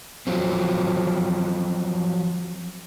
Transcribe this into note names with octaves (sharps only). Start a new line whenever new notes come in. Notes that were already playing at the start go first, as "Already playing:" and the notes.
F3 F#3 C4